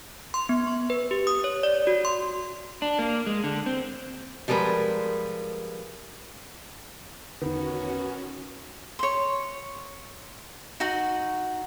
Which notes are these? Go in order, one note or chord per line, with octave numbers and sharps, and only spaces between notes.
C6
B3
C#6
B4
G4
D#6
C#5
D5
F#4
C6
D4
A#3
G#3
D3
C4
F3 G3 G#3 A#4 B4
E2 D3 D#3 B3 C#4 F#4
C#5 C6
D#4 F#4 F#5